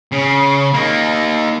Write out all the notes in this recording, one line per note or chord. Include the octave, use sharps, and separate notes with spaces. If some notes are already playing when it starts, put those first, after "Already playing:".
C#3
A#3 D#4